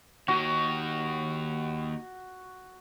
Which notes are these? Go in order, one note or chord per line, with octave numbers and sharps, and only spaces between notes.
D#2 D#3 F#4